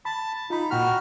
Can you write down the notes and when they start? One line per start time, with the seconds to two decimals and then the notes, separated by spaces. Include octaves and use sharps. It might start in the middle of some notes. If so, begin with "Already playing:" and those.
0.05 A5 B5
0.50 D#4 F4 B5
0.71 A#2 F#4 G5 B5 F6